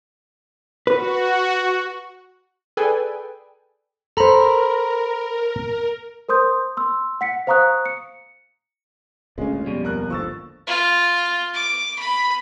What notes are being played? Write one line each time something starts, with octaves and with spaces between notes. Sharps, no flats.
F#4 B4
G#4 A4 B4 D5 G5 G#5
A4 A#4 C5 A#5 B5
A#4 C5 C6 D#6 G6
C6 E6
F#5 B6 C#7
C5 F5 A#5 C#6 D#6 F#6
C#7
D2 A#2 C#3 G#3 C#4
F2 B2 G3
D#1 A#4 F#6
G#1 D3 F3 C#6 E6 A6
F4
D6
B5